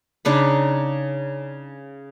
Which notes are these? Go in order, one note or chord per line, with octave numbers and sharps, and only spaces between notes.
C#3 D4 D#4 B5